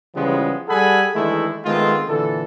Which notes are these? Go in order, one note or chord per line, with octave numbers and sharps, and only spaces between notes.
C#3 E3 F3 G3 G#3 B3
G3 G#4 A4 F#5 G#5 B5
D#3 E3 G#3 A3 D4 E4
D#3 G#3 A3 B3 C4 F4
A#2 D3 E3 A4